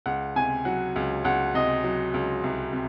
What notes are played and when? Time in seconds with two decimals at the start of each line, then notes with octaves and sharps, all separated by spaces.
0.06 C#2 F#5
0.36 C3 G#5
0.65 F#3 F#5
0.96 C#2
1.25 C#2 F#5
1.54 C3 D#5
1.84 F#3
2.14 C#2
2.44 C2
2.73 C3